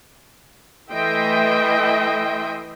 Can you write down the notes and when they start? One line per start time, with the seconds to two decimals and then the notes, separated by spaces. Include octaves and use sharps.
0.91 E3 A3 D#5 E5 G5 C6